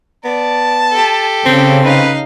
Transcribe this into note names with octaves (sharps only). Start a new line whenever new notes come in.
B3 D5 A5
G4 A4
C#3 C4
D#4 B4 F5